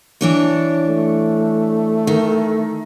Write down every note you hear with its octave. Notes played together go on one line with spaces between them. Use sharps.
E3 D4 C#5
A3
D#3